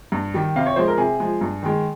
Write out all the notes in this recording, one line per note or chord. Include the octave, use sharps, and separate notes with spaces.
G2
D#3 G3
C3 F5
C#5
F3 G#3 C5
A#4
C3 G#4
F3 G#3
G2
D#3 G#3